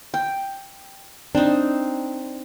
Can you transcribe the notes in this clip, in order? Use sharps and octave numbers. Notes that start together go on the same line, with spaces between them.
G5
C4 D4 D#4